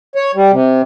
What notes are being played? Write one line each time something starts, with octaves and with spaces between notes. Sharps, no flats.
C#5
G3
C3